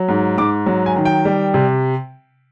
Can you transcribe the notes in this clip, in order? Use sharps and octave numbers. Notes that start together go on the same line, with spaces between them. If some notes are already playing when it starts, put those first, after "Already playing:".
Already playing: F#3
G#2
G#2 D6
F#3
G#5
D#3
G5
G3
C3